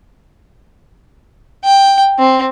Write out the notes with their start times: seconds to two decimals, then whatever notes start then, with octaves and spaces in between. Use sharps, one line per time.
1.64 G5
2.18 C4